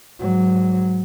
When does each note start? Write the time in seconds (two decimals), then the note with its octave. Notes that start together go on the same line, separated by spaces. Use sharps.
0.19 G#2 F#3